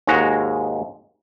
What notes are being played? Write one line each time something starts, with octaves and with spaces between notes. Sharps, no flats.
D#2 G#2 G#3 F#4 A#5